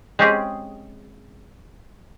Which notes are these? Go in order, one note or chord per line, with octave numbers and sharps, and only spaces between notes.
G#3 C4 C#4 G4 G#4